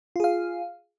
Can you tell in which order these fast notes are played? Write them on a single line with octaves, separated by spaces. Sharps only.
F4 G#4 F5